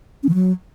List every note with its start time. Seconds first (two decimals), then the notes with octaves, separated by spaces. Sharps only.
0.23 C#4
0.29 E3
0.34 F#3